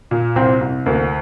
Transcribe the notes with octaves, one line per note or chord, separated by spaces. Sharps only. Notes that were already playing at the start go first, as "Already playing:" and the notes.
A#2
C2 C4
C2
D2 A#3